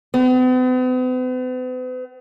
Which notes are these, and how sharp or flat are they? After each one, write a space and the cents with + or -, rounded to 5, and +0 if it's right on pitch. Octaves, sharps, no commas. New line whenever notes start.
B3 +45